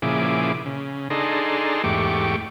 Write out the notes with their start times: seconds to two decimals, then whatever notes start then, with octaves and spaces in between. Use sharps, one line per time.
0.02 A#2 C#3 F3 E4 G#4 D6
0.65 C#3
1.10 D4 D#4 G#4 A4 A#5 C6
1.84 E2 G#2 A3 G4 C#6 D6